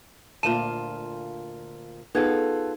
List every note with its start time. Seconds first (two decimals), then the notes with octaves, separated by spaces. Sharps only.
0.43 D2 A#2 F4 A5 D#7 E7
2.15 B3 D#4 F4 G#4 A4 G#6